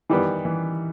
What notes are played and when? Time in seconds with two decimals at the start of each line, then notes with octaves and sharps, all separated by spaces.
0.09 D#3 E3 G3 B3
0.45 E3